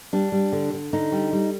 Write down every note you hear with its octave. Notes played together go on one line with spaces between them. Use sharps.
G3 D4
G3
D3
D3
D3 D#4
G3
G3